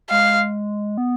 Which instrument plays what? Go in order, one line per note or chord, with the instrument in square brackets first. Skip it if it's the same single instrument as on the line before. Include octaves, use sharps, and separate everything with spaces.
[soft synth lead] G#3 [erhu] F5
[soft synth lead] B3